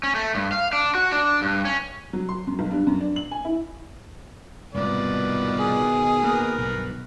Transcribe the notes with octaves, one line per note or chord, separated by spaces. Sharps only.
C#4
A3
G2
F5
D4
F#4
D4
G2
C#4
F#3
C6
F#2
B1
G2
F#2
D4
F#7
G#5
E4
C2 G#2 B2 D#3 F3 B4 D5
G#4
A#3 A#4 B4
B1 G2